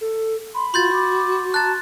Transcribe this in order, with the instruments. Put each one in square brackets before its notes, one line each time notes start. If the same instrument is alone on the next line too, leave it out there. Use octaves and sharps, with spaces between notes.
[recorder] A4
[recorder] B5 [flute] C6
[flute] F4 [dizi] F#4 [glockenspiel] C6 G6 A6
[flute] D6
[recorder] A5 [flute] A#5 [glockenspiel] F#6 A6